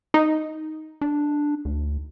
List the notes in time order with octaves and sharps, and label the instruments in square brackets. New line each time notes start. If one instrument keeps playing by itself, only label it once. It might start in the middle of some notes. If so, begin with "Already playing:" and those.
[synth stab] D#4
[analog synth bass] D4
D2